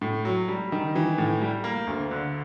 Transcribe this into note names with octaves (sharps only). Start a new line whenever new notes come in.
A2
F#3
G3
D#3
E3
A2
G3
A#3
D2
D3